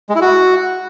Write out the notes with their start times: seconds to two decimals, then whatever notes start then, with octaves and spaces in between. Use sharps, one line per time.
0.09 G#3
0.16 E4
0.22 F#4